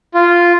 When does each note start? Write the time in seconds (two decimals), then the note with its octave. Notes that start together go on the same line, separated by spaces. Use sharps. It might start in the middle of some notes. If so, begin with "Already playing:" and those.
0.15 F4